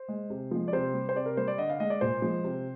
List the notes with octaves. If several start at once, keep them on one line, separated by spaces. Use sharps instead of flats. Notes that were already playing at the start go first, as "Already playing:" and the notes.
Already playing: C5
G#3
C3
F3 G#3
D5
C3 C5
G3
C5
C3 D5
A#4
G3 C5
D5
D3 D#5
F5
G#3 D#5
D5
A#2 C5
F3 G#3
C3